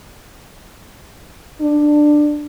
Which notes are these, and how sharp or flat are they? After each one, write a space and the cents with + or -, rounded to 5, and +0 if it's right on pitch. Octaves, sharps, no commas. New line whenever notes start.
D4 +15